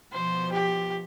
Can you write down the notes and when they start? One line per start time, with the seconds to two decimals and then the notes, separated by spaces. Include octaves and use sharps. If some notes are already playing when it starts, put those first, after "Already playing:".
0.12 B2 F3 C5
0.52 G4